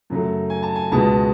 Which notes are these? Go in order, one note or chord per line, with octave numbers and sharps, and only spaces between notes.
F#2 C#3 F#3 A3
G#5
A5
G#5
C#2 B2 G#3 A5